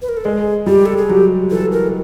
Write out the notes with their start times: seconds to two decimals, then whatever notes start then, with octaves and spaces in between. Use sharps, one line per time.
0.02 B4
0.09 A#4
0.17 A4
0.25 G#3 G#4
0.66 G3 G4
0.86 A4
0.97 G#4
1.09 F#3 G4
1.51 E3 A4
1.72 A#4